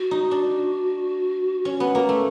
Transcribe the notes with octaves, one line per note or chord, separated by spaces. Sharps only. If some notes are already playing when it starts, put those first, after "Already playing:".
Already playing: F#4
D#4
D4
C#4
B3
A#3
A3